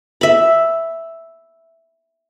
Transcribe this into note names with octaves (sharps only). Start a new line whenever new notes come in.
E5 B5